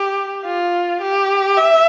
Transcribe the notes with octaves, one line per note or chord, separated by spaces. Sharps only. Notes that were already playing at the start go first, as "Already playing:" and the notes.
Already playing: G4
F4
G4
E5